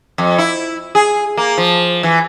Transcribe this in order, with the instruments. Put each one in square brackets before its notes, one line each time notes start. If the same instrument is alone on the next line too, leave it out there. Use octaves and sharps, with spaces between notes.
[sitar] F2
E4
G#4
A#3
F3
E3